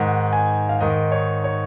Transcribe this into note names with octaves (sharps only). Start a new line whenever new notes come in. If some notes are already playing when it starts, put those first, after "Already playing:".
Already playing: G#2 D#3 F#5
G#5
F5
G#2 D#3 D#5
C#5
C#5